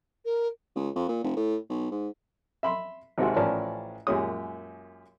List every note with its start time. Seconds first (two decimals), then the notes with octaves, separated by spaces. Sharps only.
0.25 A#4
0.76 C#2
0.96 F2
1.08 A#2
1.24 F1
1.37 A2
1.69 B1
1.91 G#2
2.63 E5 B5 C6
3.18 G#1 C3 G#3 F#4
3.36 A1 F3 C#4 A#4 D5 A5
4.07 F#2 A#2 G#3 G4 C#5 D#6